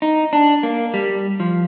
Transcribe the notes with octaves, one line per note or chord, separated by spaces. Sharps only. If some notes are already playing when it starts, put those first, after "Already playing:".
D#4
D4
A#3
G3
F3